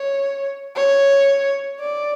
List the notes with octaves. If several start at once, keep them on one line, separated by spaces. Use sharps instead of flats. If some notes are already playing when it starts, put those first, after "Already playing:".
Already playing: C#5
C#5
D5